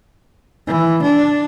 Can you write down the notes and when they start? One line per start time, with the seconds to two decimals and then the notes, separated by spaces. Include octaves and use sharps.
0.67 E3
1.02 D4